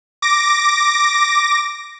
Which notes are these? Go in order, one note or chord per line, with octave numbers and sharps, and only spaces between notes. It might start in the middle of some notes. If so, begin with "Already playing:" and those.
D6 A#6